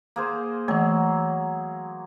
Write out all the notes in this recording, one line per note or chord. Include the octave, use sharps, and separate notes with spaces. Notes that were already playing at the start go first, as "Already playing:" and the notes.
A#3 G#4 C5
E3 F#3 A3